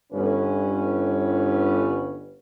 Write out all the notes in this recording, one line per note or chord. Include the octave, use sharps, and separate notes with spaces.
G1 C#4 B4